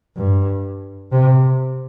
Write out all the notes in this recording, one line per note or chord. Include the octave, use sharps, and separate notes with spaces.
G2
C3